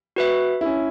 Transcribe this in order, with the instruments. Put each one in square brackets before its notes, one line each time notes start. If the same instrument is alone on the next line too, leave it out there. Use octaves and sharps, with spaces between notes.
[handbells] F#4 B4 E5
[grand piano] E4
C#4